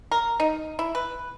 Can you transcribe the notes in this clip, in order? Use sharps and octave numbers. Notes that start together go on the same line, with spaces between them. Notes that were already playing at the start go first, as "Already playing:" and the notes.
A#4
D#4
E4
B4